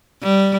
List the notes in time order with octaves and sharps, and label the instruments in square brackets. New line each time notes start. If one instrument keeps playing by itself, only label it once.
[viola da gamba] G3